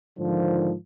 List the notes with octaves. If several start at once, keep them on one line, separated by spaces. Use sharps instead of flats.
G#2 D3 D#3 F3